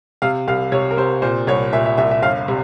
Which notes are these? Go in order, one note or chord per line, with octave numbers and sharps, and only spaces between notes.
C3 F5
C2 F5
C3 C#5
A#4
C3 C5
A#2 C5
C2 C#5
A#2 E5
E5
C2 E5
E5
G1 F5
C3